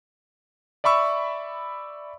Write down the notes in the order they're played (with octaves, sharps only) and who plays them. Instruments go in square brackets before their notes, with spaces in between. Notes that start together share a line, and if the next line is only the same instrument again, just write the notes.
[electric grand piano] D5 E5 B5 C#6 E6